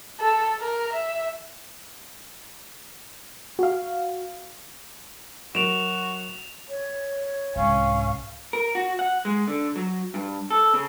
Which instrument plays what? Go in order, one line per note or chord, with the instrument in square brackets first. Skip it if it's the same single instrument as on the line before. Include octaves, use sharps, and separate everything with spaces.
[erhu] A4
A#4
E5
[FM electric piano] F#4 F5
[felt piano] F#3 A#4 D7 [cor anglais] F#4 [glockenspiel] E7 F7
[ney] C#5
[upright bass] C2 G#2 [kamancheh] C#4 [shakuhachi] F5
[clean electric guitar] A#4
F#4
F#5
G#3
D3
F#3
G2
A4
C#3